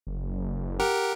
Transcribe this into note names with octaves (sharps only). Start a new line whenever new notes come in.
F#1
G4 A#4 F#5